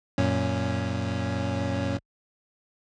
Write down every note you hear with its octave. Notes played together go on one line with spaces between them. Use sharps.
F#2 A#2 C#4